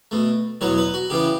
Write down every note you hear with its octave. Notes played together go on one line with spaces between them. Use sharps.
B2 A3
E2 B2 F#3 B3 C#5
B4
F#4
C#3 E3 B3 G4